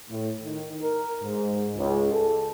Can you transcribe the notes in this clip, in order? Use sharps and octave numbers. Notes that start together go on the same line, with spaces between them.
A2
D#3
A#4
G#2
C#2
A4